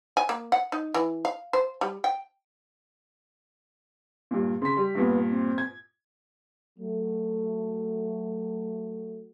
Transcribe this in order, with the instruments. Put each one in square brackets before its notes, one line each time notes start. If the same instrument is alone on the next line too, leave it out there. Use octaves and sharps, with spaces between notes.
[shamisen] G#5
A#3
F#5
D#4
E3
F5
C5
G3
G5
[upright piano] G2 A#2
[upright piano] C#3 B6 [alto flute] C6
[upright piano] G3
[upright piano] G2 A#2 [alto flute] B3
[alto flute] C4
[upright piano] G#6
[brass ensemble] F#3 A3